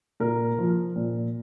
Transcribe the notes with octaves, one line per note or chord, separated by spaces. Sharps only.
A#2 A#4
F3
A#2